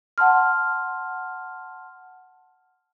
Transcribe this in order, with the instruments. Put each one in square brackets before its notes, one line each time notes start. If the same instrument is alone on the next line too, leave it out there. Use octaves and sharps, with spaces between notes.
[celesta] F#5 A5 C6 F6